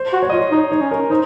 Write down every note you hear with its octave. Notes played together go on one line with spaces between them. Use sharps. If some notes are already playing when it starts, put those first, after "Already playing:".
Already playing: C5
F#4
C#5
F4 D#5
C#5
D#4 C#5
D#4 C#5
C#4
A#4
D#4 C5